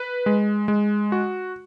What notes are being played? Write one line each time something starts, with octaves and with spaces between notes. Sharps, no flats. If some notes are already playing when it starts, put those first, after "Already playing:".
Already playing: B4
G#3
G#3
F#4